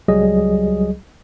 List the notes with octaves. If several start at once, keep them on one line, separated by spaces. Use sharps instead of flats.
C#2 F#3 G3 G#4 D#5